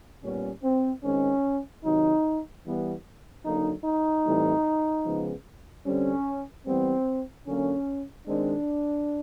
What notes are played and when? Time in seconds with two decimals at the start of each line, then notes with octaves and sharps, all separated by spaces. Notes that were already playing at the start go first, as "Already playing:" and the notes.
0.24 A#2 G3 B3 C#4
0.63 C4
1.04 D#3 G#3 C4 C#4
1.84 C3 D#3 F#3 D#4
2.65 E3 G3 B3
3.45 D3 F#3 A#3 D#4
3.85 D#4
4.26 A2 E3 G3 C4
5.06 C#3 F3 G#3 B3
5.86 D3 G3 C4 C#4
6.67 E3 G3 B3 C4
7.47 D3 F#3 A#3 C#4
8.28 D#3 G#3 C4 D4